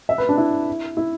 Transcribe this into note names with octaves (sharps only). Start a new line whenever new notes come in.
E5
B4
D4
E4
E4